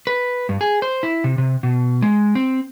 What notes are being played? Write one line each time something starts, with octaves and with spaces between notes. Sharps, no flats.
B4
G2
G#4
C5
E4
C3
C3
B2
G#3
C4